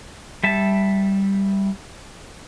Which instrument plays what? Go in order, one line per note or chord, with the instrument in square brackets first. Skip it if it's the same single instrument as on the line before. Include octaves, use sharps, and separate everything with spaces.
[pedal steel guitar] G3 E5 A5